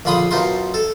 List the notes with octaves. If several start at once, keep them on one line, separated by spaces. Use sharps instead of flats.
A#1 D3 F4 B5 C6 D#6
F#2 B2 D#4 F4 C6
A4